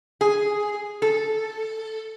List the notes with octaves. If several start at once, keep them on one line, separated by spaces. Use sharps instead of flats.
G#4
A4